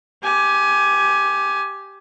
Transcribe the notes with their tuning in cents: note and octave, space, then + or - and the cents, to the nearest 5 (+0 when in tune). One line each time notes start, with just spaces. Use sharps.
G4 +0 G#5 +15